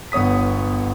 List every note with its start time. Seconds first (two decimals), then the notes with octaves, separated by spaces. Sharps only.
0.12 G1 B3 C#5 D#6 B6